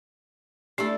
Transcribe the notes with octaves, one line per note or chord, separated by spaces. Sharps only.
A3 D4 E4 G4 A4